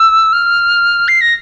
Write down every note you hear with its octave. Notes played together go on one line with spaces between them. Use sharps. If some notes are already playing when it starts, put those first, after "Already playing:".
Already playing: E6
F6
C7
A#6